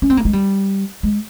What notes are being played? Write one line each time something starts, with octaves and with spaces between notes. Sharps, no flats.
C#4
C4
A#3
G#3
G3
G#3